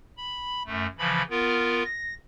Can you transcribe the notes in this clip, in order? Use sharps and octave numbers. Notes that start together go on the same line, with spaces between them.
B5
F#2 A3
C#3 E3 F3 B5
B3 F4 A#4
A#6